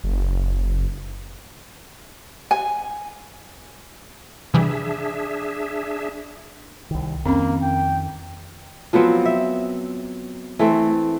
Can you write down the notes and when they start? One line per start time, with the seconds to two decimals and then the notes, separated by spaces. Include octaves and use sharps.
0.04 F#1
2.51 G#5
4.54 C3 E3 G3 D4 G#4 E5
6.91 C2 D#3
7.26 F2 D#3 A#3 C4 C#4
7.62 G5
8.93 F3 F#3 B3 C4
9.25 E5
10.59 E3 A3 C4